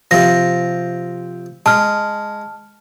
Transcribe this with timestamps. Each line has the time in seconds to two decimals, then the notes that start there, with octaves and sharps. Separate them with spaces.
0.11 C3 F3 A#6
1.66 G#3 A5 F6